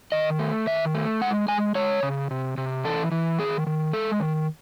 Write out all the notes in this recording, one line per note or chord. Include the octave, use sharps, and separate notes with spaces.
D#3 D#5
A3
D#3 E5
A3
G#3 F#5
G#3 G#5
G#3 C#5
C#3
C3
C3
E3 A4
E3
D#3 G#4
D#3
G#3 A4
D#3